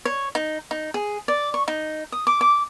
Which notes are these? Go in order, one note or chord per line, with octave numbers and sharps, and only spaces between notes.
C#5
D#4
D#4
G#4
D5
C#6
D#4
D#6
D6
D6